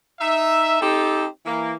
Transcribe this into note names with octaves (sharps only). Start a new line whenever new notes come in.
D#4 E5
C4 D#4 G4 A4
E3 A#3